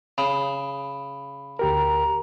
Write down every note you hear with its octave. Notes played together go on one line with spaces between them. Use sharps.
C#3 B5
D2 G4 A#4 A#5